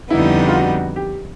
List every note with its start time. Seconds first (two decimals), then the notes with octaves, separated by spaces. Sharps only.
0.10 F2 D3 G3 B3 D#4 E4
0.48 F4
0.53 F#4
0.96 G4